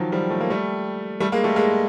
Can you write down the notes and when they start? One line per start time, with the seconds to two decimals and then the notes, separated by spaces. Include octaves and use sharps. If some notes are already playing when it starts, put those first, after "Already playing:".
Already playing: D#3 F3 F#3
0.12 F3 G3
0.30 A3
0.40 A#3
0.50 G3 A3
1.20 G3 A3
1.32 G#3 A#3
1.44 G3 A3
1.56 G#3 A#3